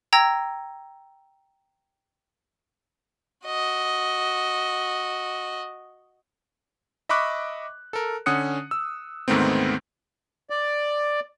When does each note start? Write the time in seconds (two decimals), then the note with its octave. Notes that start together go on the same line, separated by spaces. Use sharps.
0.13 G5 A#5 E6 G#6 A#6
3.46 F#4 D#5
7.09 D#5 E5 B5 C#6 D6 F#6
7.93 A4 A#4
8.26 D3 C#4 F#5 D#6 F#6 C#7
8.71 E6
9.28 D2 G#2 D#3 A3 B3 C4
10.50 D5